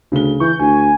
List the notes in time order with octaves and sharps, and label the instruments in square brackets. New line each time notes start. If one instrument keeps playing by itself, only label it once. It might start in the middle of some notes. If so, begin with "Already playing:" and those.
[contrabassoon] D2 [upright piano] C#3 G7
[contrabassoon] E3 [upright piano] C#6 [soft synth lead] G6
[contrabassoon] D2 [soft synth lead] G#5